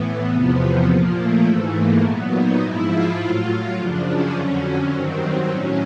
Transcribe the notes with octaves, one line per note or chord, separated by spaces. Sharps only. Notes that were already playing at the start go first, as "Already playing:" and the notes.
Already playing: A2 E3 B3
E2 C3 F3
A#2 F3 A#3
A3
G#2 E3 A3
A#3
A#2 F#3 B3
D#4
G#2 F3 E4
F4
A2 F#3
F#2 C#3 F3 D4
C#4
F2 D3 F#3
G2 D#3 F#3 C4
A2 F#3 C#4